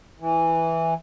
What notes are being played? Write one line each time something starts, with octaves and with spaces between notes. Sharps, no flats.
E3